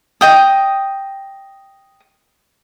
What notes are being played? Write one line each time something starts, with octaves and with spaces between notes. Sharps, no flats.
D#5 G5 D#6